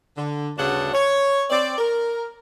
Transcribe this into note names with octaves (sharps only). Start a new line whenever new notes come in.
D3
D2 G2 C#3 D4 F#4 F#5
C#5
C4 D5
A#4